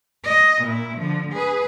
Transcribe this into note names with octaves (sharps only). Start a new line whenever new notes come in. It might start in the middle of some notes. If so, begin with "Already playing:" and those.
D#5
A#2 E4
D3 F3
G#4 B4